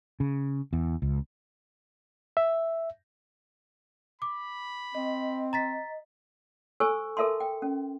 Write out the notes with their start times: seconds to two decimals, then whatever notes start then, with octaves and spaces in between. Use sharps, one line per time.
0.20 C#3
0.73 E2
1.02 C#2
2.37 E5
4.22 B5 D6
4.95 C4 D#5
5.53 A#5 A6 B6
6.80 A4 C5 G#5 C#6 E6
7.17 A4 A#4 E5 A5 C6
7.40 G5
7.62 C#4